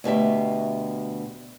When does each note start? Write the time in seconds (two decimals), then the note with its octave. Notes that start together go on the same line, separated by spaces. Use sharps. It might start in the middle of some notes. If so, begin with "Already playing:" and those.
0.04 D2 B2 G4 E5